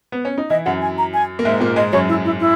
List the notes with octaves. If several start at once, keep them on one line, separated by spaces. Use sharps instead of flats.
B3
C#4
D#4
E3 E4 D#5
F#2 F#3 F#5
G#5
A#5
G#5
A#3
G#2 G#3 E5
A#2 A#3
G#2 G#3 D#5
F#2 F#3 C#5
E4
E4
E4